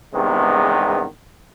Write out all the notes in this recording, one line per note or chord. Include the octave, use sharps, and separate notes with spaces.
E2 G2 C3 D#3 G#3 B3